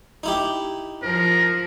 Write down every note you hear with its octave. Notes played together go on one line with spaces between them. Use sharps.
D#4 E4 G4
F3 A#4